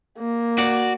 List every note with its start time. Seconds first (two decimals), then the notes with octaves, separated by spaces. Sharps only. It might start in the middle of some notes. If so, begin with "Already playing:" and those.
0.18 A#3
0.58 F#4 D5